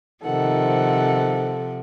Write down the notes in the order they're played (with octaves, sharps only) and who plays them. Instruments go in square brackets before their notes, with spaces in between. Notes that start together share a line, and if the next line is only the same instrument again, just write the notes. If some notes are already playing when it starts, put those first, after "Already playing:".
[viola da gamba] C3 F3 [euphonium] D#3 [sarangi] A4 [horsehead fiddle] F#5